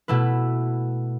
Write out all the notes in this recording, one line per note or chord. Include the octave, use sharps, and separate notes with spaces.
B2 A3 E4 B4